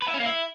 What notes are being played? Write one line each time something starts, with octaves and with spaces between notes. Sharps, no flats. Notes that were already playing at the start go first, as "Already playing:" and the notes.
B4
E4
C#4
A#3
E4